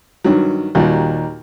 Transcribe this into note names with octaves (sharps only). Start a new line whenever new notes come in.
G2 D#3 F#3
D#2 A#2 G3 F#4